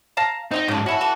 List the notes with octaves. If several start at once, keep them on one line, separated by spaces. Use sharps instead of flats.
F5 A5 A#5
C4 D#4 D#5 G5
G#2 C#3 C#4 D4
C#4 E4 F#4 A4
E3 A4